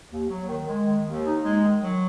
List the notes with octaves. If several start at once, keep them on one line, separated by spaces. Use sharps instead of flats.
D#2
F#3
D#3
G#3
D#3
D#2
D#4
G#3
D#3
F#3